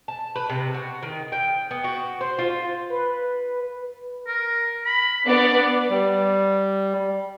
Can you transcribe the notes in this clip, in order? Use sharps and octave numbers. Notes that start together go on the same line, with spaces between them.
A5
B4
C3
F#4
D#3
G5
B3
F#4
C5
F4
B4
A#4
B5
B3 D4 D5
G3